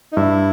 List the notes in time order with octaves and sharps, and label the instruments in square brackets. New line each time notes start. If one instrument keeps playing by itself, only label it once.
[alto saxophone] D#4
[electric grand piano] G2 [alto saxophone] E4